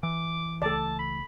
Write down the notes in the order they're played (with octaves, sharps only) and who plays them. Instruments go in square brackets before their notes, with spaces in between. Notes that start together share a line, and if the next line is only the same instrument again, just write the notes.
[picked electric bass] E3 [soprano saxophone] D6
[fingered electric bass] C#2 A3 [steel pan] A4 D5 [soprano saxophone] A5
[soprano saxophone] B5